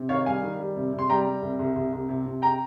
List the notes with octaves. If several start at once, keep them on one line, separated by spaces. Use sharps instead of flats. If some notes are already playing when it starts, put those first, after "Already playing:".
Already playing: C3
D#3 C#5 F5
G3 F5 G#5
D#3
G3
C3
C3
C6
G3 G5 A#5
G3
C2
C2
C2
C2
C3
C3
G5 A#5